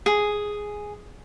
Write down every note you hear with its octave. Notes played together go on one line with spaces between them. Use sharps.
G#4